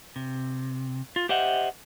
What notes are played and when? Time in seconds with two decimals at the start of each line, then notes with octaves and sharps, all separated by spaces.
0.16 C3
1.16 F4
1.29 G4 C5 D#5 E5 F#5